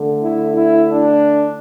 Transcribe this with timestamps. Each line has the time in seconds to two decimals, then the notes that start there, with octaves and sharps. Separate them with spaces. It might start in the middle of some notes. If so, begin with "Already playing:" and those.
Already playing: D3 A3
0.20 E4
0.53 E4
0.87 D4